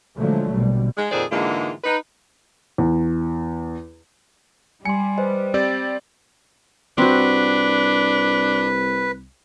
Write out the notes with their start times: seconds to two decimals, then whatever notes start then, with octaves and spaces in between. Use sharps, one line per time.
0.19 A#2 D3 F3 F#3 G#3 A3
0.52 A#1 B2 D3 G3
0.97 G#3
1.12 F2 A#2 D#3 G#4 C5 D5
1.31 G#2 D3 E3 G#3 A#3 F4
1.84 D#4 B4
2.78 E2
4.85 G3 G#5 C6 C#7
5.18 B4 C5 D#5
5.54 C4 G4 D5 E6 A6
6.98 C2 C4 D4 F#4 B4